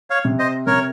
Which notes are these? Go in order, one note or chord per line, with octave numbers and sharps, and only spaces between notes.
C#5 F5
C3
C5 D#5
C3 A#4 C#5